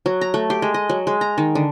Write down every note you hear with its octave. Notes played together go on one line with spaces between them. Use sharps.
F#3
A#5
A3
G4
G#3
D#5
F#3
G#3
A#5
D#3
D3